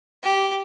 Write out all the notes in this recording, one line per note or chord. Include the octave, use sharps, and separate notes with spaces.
G4